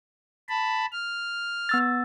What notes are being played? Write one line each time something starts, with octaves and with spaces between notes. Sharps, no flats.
A5 B5
F6
B3 E6 A6